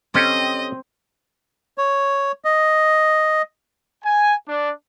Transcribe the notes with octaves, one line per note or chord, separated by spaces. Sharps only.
C4 C#4 G4 A4 D#5
C#5
D#5
G#5
D4